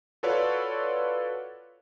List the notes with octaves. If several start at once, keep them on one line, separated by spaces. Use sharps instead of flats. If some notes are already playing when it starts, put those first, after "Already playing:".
F4 F#4 A4 B4 C#5 D5